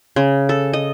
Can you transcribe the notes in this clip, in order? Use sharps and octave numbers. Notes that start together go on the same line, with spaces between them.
C#3
A4
D#5